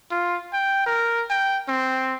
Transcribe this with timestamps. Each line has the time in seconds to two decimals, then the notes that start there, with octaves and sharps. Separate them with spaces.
0.11 F4
0.53 G5
0.86 A#4
1.30 G5
1.69 C4